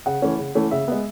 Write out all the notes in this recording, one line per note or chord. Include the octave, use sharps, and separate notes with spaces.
C#3 F#5
E3 A3 C#4
C#3
E3 A3 C#4
C#3 E5
G#3 B3